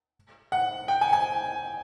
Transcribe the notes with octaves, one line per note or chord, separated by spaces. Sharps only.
F#5
G5
G#5
G#5